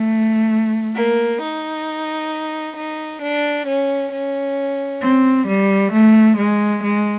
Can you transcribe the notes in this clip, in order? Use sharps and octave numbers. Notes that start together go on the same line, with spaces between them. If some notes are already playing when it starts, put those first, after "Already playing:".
Already playing: A3
A#3
D#4
D#4
D4
C#4
C#4
C4
G3
A3
G#3
G#3